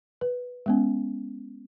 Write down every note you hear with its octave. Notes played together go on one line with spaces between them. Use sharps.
B4
G#3 B3 C#4